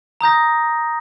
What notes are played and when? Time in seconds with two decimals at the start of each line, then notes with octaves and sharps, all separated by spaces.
0.21 A#5 D#6 G6 A#6